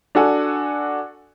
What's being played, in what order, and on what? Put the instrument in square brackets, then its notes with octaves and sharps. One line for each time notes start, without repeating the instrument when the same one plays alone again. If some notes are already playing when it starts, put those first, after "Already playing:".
[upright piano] D4 F#4 A4 F#5 G#5